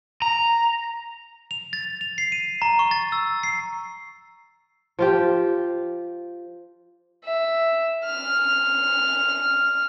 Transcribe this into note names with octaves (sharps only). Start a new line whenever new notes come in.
A#5
F7
A6
F7
C7
D#7
A#5
C#6
A6
E6
C7
F3 F4 G4
E5
F6